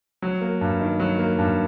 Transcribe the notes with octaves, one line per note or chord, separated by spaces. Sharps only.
F#3
A#3
G2
D#3
F#3
A#3
G2